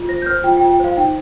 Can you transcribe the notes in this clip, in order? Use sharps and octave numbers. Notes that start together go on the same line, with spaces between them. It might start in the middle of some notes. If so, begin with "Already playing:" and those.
Already playing: F4
C5 A#6
G6
C5 F6
F4 G5
G5
F4
G5
C5 F5
D#4 G5